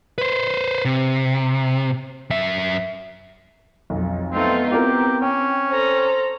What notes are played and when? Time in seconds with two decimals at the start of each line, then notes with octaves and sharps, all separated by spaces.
0.18 B4 C5
0.85 C3
2.30 F#2 E5
3.90 B1 F2
4.32 A3 B3 C4 D#4 F4
4.72 C4 E4 F4 G4 A#4
5.22 C#4 G5
5.71 A4 C5 A#5